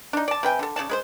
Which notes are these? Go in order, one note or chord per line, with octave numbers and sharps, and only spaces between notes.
D4 D#4
D5 A5
C3 B4 G5 G#5
D3 A4
C#3 F#4 D5 A5
G#3 B4 C5